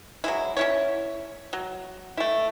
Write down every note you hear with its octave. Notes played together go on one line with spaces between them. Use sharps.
F#3 G#3 E4
C#4 E4 C#5
F#3
A3 E4